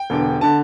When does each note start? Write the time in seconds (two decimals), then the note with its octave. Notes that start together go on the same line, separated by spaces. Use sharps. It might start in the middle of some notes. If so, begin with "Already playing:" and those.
Already playing: G5
0.10 E1 E2 D3
0.41 D3 A5